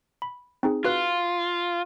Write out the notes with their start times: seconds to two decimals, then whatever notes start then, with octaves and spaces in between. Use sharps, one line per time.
0.22 B5
0.63 C4 D#4 G#4
0.85 F4 F#4 B4 F#6